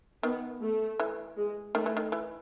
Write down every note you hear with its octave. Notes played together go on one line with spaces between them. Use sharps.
D#3 B3
A3
E3
G#3
D#3 A3
E3
D#3
E3